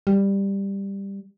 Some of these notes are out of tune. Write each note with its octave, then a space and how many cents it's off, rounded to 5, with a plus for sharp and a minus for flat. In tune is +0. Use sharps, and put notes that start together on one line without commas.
G3 +10